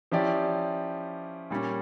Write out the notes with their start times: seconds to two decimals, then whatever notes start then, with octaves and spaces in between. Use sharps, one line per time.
0.12 F3 C#4 E4 G4 D5
1.50 A#2 G3 C#4